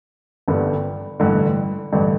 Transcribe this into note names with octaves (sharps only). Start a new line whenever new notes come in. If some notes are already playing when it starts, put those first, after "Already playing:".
G1 G2 D3 G3 B3
A1 G2 D3
A1 G2 D3